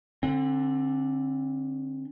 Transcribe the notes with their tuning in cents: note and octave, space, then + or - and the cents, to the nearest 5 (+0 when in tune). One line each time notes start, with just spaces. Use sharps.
D3 +0 C4 +35